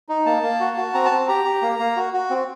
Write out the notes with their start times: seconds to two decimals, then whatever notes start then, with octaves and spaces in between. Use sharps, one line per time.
0.09 D#4
0.26 A#3 A5
0.43 A#3
0.60 F#4
0.77 F#4
0.94 C4 A#5
1.06 A5
1.11 C4
1.28 G4 A#5
1.45 G4
1.62 A#3
1.79 A#3
1.96 F#4
2.13 F#4
2.30 C4